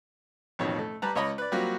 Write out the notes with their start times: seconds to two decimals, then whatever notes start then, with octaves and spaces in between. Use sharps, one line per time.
0.59 A1 F2 B2 D#3 C#5
0.79 A3
1.02 G3 B4 A5 A#5
1.15 C#2 C#5 D#5 B5
1.38 B4 D5
1.52 F#3 G3 A#3 C4 F4 F#4